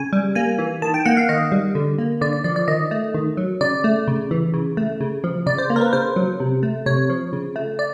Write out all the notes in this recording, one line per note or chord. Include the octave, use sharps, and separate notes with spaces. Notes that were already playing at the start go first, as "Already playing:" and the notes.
Already playing: C#3 G#5
G3
A#3 G#5
E3
D#3 A5
G5
A#3 F#5
F5
D#3 D#5
G3
D3
A#3
D3 D5
D5
F3 D5
D5
D#3 D#5
A3
D#3
F#3
C#3 D5
A3
C#3
E3
C#3
A3
C#3
F3
C#3 D5
C5
A#3
A#4
B4
C#3 C5
F#3
C3
A3
C3 C#5
F3
C#3
A3
D5